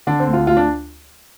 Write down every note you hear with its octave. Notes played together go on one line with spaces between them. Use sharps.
D3 D4
C4
D2
F4
D2 F4
D4